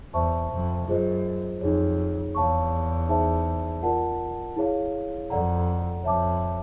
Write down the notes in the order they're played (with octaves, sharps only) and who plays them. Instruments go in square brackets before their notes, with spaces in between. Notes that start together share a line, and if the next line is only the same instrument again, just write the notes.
[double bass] E2 [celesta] C5 E5 A5 C#6
[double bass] F2
[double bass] F#2 [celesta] F4 G#4 C5 D#5
[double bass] F2 [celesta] D#4 G#4 C#5
[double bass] E2 [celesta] C#5 F5 A5 C#6
[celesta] D#4 G#4 C5 E5 A5
F4 A#4 D5 F#5 A5
E4 G#4 C#5 F5
[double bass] F2 [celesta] A4 D5 F#5 A#5
[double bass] F2 [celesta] C#5 E5 A5 D6